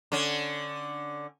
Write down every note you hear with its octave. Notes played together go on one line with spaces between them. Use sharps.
D3 C#4